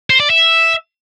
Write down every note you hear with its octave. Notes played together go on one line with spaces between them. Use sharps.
C5
D5
E5